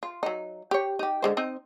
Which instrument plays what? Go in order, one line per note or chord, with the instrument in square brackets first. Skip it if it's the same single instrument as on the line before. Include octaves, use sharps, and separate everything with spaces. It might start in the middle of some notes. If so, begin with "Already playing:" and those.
[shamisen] F4
F#3 D#4
G4 C#5
D#4 G4
D3 G#3 C5
C4 D#4 D#5